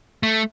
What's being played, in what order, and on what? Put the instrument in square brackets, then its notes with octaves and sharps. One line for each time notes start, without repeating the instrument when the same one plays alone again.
[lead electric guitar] A3